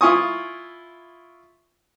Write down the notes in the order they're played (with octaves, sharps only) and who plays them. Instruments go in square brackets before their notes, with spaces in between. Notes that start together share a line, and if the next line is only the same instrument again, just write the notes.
[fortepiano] E4 F4 G#5 C#6 D#6